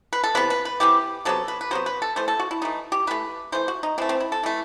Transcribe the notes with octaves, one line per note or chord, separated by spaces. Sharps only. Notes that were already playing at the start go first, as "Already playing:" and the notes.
B4
A4
C3 E3 B3 B4
B4
B4
C3 E3 B3 G4
C3 F#3 B3 A4
B4
B4
C3 F#3 B3 C5
B4
A4
E3 A3 C5
A4
F#4
E4
E3 A3 D#4
G4
E3 A3 B4
E3 A3 C5
F#4
D#4
E3 A3 C4
C4
E4
A4
E3 A3